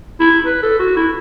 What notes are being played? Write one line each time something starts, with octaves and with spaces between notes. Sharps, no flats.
E4
B4
A4
F#4
E4